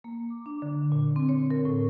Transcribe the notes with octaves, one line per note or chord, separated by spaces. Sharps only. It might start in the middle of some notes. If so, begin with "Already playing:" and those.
A#3
D6
D4
D3
A#2
C4
C#5
A#4
A2